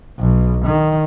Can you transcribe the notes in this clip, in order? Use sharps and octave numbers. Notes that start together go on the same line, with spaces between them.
B1
D#3